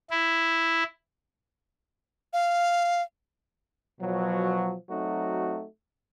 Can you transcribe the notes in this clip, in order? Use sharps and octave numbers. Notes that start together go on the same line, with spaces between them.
E4
F5
B2 F3 F#3
F#3 A3 C4 D#4 F#4